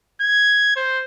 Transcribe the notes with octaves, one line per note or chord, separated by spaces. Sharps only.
G#6
C5